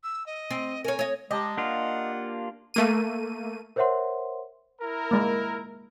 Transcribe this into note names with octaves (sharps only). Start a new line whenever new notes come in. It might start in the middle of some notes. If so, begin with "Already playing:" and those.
E6
D#5
C4
A#4 C#5 G#5
C#5 D#5
G#3 G4 D#5 A5 A#5
A#3 D4 F4 F#5
A3 A#3 D#7
A#4 C5 C#5 E5 F#5 C6
E4 A#4
G#3 A#3